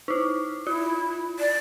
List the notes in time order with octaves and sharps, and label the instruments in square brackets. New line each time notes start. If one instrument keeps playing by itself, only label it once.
[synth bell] D#4 E4
[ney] E4 [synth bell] F4
[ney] D5